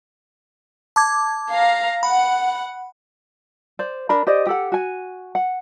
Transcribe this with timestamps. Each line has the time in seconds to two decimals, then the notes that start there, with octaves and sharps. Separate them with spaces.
0.96 A5 D6 G#6
1.52 F5 A#5
2.03 F#5 B5
3.79 C5 D5
4.09 D4 A#4 B5
4.27 G4 C5 D5 D#5
4.47 G4 A4 F#5
4.72 F#4 G#5
5.35 F#5